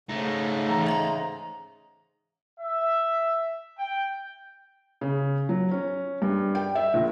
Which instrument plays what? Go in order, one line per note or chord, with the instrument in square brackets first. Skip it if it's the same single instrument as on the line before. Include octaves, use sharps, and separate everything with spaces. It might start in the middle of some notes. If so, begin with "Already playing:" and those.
[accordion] G#2 C#3 [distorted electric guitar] A3 D#4
[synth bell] E3 [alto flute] A#5
[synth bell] D#5 E5 C6
[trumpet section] E5
G5
[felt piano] C#3
F#3
C#4
G2
G5
E5
A#1